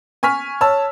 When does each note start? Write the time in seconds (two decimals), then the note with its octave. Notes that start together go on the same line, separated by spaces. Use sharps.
0.23 G#5 C#6 F6 B6
0.61 C#5 A5 E6